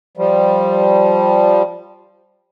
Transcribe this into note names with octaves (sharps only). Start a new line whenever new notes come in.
F3 G3